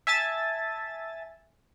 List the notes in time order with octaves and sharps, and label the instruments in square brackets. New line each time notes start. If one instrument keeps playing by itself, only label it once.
[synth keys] E5 G#5 A5 A6